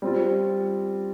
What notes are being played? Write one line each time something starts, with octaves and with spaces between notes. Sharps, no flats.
G3 C4 F4